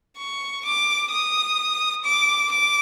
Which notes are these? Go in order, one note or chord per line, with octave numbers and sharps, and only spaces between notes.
C#6
D6
D#6
D6
D6